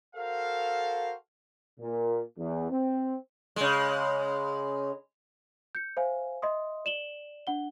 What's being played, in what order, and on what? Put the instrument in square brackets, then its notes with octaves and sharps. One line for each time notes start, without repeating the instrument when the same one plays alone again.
[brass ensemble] F#4 A4 A#4 C5 F5
[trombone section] A#2
E2
C4
[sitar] C#3 G#3
[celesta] G6 C#7
C5 E5 F5 G#5
D#5 E5 C6 D#6
D5 E7 F#7 G7
D4 F#5 G7